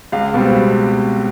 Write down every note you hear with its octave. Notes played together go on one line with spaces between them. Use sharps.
C#2 F5
B2 G3 C4